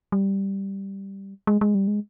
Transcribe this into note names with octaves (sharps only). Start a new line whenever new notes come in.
G3
G#3
G#3
G3
G#3